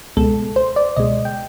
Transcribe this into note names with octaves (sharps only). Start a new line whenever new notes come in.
C#2 B2 G#3 A4
C5
D5
C#2 B2 G#3 D#5
G5